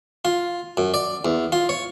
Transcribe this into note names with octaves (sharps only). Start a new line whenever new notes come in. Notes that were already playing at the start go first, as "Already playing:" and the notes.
F4
F#2
D5
E2
F4
C#5